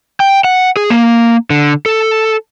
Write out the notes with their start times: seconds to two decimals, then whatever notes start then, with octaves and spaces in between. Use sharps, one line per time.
0.20 G5
0.44 F#5
0.77 G#4
0.90 A#3
1.50 D3
1.86 A4